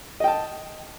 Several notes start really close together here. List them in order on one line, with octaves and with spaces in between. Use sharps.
D#5 G5 A5